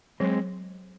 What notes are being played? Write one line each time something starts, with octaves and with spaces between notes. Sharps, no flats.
F#3 G#3 C4